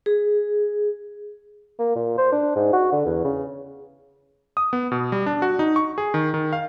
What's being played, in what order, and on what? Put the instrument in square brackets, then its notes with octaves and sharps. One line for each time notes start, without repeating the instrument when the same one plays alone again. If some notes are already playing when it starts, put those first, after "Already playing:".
[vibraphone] G#4
[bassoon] A#3
A#2
C5
D4
G#2
F#4
D3
E2
C#3
[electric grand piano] D#6
B3
B2
G3
D4
F#4
D#4
C#6
G#4
D#3
D#3
F5